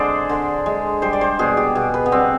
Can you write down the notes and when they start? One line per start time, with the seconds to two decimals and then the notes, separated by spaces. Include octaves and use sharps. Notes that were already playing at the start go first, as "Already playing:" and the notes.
Already playing: D3 G#3 G#4 C5 D5
0.29 D3
0.66 G#3
1.02 G3 C5
1.13 D5
1.21 C5
1.39 B2 G#4
1.57 G4
1.75 B2 G#4
1.94 B4
2.06 B3
2.12 G3 C4